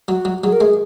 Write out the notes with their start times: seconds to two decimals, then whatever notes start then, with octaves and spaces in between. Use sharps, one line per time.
0.08 F#3 F#4
0.25 F#3
0.43 F#3 G#4
0.52 A#4
0.61 G#3 G#4